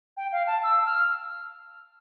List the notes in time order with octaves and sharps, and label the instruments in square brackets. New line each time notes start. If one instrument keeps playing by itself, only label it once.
[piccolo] G5
F5
A5
E6
F6